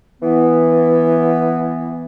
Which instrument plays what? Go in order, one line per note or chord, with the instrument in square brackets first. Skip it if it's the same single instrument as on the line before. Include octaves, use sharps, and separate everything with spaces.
[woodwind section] E3 B3